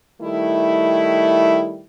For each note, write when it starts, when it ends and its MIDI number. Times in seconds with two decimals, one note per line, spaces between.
0.21 1.86 51
0.21 1.86 55
0.21 1.86 57
0.21 1.86 64